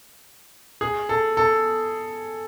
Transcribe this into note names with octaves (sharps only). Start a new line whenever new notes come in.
G#4
A4
A4